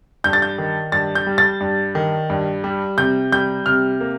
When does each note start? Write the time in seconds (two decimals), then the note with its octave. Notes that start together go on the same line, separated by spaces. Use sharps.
0.24 G2 G6
0.33 A6
0.42 G6
0.58 D#3
0.92 G2 A6
1.15 G6
1.27 G3
1.38 A6
1.60 G2
1.95 D#3
2.30 G2
2.64 G3
2.98 C3 G6
3.32 G3 G6
3.66 C3 F6
4.01 A#3